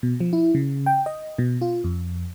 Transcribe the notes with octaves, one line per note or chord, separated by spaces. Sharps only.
B2
F3
E4
C#3
G5
D#5
B2
F4
F2